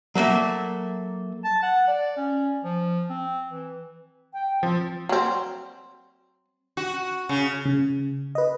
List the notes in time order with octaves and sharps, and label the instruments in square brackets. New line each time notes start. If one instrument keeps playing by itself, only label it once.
[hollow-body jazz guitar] F#3 A3 A#3 E5
[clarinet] A5
F#5
D5
C#4
F3
C4
E3
[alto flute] G5
[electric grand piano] F3 [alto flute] C4
[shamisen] F#3 C4
[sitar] F#4
C#3
[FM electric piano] C#3
B4 D#5